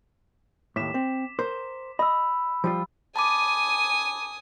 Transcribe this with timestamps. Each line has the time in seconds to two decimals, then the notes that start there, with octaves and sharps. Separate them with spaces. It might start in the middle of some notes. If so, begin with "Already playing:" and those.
0.76 D#2 A2 D6 B6 E7
0.94 C4
1.39 A#4 C5
1.99 D#5 B5 E6
2.64 F3 G3 F4
3.16 G#5 A5 B5 D6 D#6